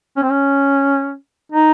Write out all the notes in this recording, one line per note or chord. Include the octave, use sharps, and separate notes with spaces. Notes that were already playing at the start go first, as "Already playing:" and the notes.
C#4
C4
C#4
D#4